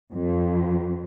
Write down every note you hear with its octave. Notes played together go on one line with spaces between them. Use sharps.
F2